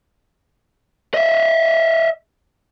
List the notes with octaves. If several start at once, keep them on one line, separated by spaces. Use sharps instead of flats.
D#5 E5